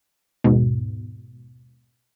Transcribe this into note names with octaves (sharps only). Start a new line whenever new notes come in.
D#2 G#2 B2